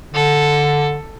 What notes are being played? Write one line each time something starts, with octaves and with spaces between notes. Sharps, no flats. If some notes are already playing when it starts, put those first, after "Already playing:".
D3 A4